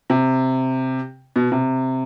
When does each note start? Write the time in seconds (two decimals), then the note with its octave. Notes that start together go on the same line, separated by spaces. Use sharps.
0.10 C3
1.36 B2
1.52 C3